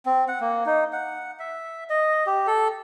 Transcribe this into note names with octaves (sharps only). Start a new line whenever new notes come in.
C4
F#5
A#3
D#4
F#5
E5
D#5
G4
A4